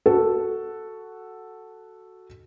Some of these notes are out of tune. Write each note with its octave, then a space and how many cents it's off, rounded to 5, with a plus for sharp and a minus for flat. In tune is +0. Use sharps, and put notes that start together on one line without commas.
F#4 +0 A4 +0